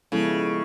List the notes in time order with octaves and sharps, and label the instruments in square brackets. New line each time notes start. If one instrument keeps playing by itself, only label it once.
[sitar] C#3 [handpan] F3 G#3 B3 E4 A4